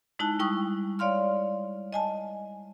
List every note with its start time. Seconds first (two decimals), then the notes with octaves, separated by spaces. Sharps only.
0.19 G#3 D#4 E4 A5 F#6
0.39 G3 E4 G5 C#6 D#6
0.99 C#5 D5 F5 C6 F6
1.93 D#5 G#5 A5